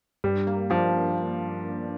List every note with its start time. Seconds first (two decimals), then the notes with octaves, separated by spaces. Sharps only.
0.24 G2 G3
0.47 A#3
0.70 F3 D4